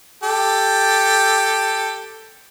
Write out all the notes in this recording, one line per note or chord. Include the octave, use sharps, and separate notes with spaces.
G4 A4